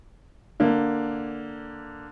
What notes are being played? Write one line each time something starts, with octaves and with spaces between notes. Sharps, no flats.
D3 A#3